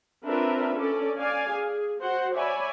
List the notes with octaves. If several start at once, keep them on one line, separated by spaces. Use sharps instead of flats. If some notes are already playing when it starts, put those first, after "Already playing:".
C4 D4 F4 A#4 B4 E5
C#4 A4 D5
D5 F5 G#5
G#4
F#4 C5 F#5
C#5 D5 E5 G#5 B5